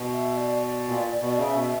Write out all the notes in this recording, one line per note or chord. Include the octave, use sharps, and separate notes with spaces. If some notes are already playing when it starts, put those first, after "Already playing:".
Already playing: B2
E5
D5
D5
A#2
B2
C#3 E5
B2
E5